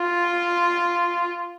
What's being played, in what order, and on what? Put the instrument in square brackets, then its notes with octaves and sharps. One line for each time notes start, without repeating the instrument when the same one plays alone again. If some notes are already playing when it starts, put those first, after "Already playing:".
Already playing: [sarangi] F4